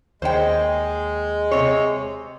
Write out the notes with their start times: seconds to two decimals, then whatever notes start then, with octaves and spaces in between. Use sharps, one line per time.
0.22 D#2 G#3 C5 C#5 G5
1.51 C3 C#5